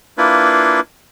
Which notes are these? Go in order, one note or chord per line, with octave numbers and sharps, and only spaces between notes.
A#3 D4 E4 F4 B4